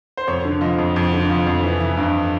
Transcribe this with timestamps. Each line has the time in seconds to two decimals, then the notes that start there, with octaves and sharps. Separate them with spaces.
0.17 C5
0.27 F2 C#5
0.45 D3
0.61 F3 D#5
0.78 F2
0.96 F2
1.13 D3
1.30 F3
1.47 F2
1.63 E3
1.80 E3
1.97 G2